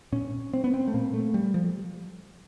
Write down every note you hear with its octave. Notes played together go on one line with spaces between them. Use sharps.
A#2 C#4
C4
B3
C4
A3
A#2 A#3
A3
G3
F3